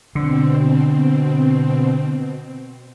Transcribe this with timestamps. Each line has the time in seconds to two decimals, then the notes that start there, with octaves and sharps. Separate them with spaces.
0.15 B2 D3 C4